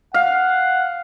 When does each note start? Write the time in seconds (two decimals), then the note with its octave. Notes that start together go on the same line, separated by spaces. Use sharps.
0.14 F5 F#5